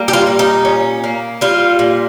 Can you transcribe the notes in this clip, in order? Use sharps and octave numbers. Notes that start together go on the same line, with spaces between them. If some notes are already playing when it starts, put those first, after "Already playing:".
Already playing: G3 A#3
G4
F4
A#2
D#4
C#4
A#3
G3 F4
A#2